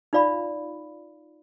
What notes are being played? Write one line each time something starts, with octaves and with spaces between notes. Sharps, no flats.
D#4 F4 D5 F5 B5